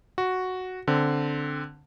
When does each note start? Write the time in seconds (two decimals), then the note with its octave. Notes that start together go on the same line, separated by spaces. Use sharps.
0.18 F#4
0.87 D3 C4